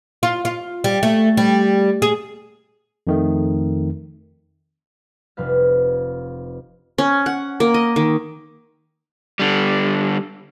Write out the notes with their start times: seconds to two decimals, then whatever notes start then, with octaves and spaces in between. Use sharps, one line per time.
0.23 F4
0.45 F4
0.84 G3
1.03 A3
1.37 G3
2.02 G#4
3.07 F2 D#3 A3
5.37 F1 D4 B4 F5
6.98 C#4
7.26 F#5
7.60 A#3
7.74 D#5
7.96 D#3
9.39 D3 G3